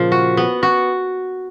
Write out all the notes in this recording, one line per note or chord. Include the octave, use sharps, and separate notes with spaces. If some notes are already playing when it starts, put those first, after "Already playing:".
Already playing: A#2 C#3 F3
F#4
B3
F#4